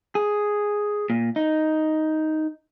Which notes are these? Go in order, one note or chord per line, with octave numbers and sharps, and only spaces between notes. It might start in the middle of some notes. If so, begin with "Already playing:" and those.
G#4
A#2
D#4